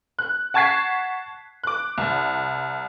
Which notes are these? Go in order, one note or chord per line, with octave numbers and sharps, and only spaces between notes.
F#6
F#5 A5 C#6 G#6 B6 C7
D6 F#6
C2